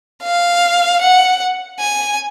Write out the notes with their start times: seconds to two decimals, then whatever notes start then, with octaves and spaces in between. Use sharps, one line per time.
0.23 F5
1.01 F#5
1.79 G#5